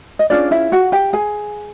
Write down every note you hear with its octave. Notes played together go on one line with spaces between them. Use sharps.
D#5
C#4 D4 F4 G#4 D5
E4 E5
F#4 F#5
G4 G5
G#4 G#5